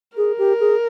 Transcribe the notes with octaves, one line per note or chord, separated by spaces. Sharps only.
G#4 A#4
G4
G#4